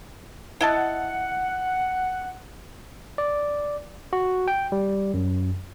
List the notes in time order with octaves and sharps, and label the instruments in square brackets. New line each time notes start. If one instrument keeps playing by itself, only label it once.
[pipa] E4 D#5 A5 [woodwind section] F#5
[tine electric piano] D5
F#4
G5
G3
F#2